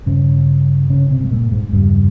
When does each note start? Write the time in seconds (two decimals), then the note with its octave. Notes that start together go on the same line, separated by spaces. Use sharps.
0.06 G2 C#3 C#4
0.90 C#3 C#4
1.10 C3 C4
1.24 G#3
1.31 A#2 A#3
1.52 G#2 G#3
1.72 E2 G2 C#3 G3